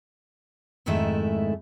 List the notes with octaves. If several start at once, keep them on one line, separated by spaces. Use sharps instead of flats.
F2 G#2 D#3 G#3 A3 E4